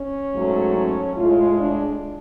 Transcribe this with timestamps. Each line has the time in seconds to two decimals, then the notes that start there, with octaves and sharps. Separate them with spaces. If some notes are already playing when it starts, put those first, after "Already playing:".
Already playing: C#4
0.33 G#2 F#3 A3
0.74 C#4
1.16 A2 G#3 F4
1.57 D4